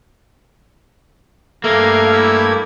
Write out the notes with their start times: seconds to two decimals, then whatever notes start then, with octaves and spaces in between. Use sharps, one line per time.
1.64 G2 A3 A#3 F5 G#6
2.13 E4